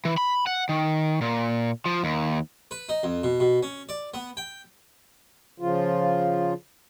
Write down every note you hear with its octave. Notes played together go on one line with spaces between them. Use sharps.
E3
B5
F#5
D#3
A#2
F3
D#2
B4
D#4
F2
B2
B2
C#4
D5
B3
G5
C#3 F3 F4